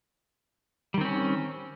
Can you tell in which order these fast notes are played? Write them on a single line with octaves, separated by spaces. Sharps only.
G3 D#3 C4 C#4